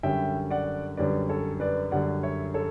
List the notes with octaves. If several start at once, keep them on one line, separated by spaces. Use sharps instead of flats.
F#2 D3 G3 C#4 E5 G5
D5 F#5
F#2 D3 G3 C#4 B4 D5
A4 C#5
B4 D5
F#2 D3 G3 C#4 D5 F#5
C#5 E5
A4 C#5